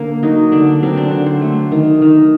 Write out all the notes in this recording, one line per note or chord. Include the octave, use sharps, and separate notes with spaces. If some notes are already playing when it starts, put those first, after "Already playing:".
Already playing: D3 A#3
F#3 D#4
D3 D4
F#3 C4
D4
D3 D4
C5
A3
D#3
D#3